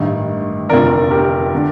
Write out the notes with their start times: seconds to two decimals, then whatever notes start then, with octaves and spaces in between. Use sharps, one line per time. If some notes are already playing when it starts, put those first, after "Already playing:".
Already playing: A1 G2 D#3
0.69 F1 F2 D3 A#4 D5
1.11 G4 A#4
1.55 D3